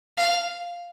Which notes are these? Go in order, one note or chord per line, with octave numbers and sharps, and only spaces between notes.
F5